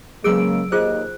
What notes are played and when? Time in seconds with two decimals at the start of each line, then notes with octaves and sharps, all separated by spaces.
0.24 C#3 F#3 G#3 A#3 G#4 B4 E6 D7
0.72 D#2 F4 G#4 C5 D#5 F#6